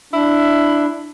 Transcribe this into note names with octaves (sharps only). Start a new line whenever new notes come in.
D4 E4